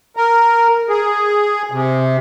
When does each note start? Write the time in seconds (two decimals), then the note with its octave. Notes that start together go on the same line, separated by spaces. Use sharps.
0.17 A#4
0.89 G#4
1.72 C3